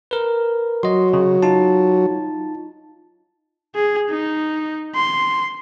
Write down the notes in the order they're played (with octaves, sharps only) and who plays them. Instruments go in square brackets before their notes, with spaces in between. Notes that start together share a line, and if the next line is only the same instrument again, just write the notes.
[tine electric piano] A#4 B4
[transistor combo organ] F#3 [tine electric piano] D#5 C6
[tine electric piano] C#3
D#4 F4 A5
[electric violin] G#4
D#4
C6